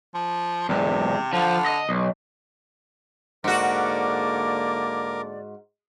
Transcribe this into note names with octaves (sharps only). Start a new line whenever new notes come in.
F3
E2 G#2 C3
D3 F3
D#5
B1
G#2 D3 A#3 F#4 A#4 D5 D6